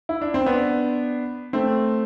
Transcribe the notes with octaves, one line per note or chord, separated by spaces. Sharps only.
E4
D4
C4
B3 D4
A3 C4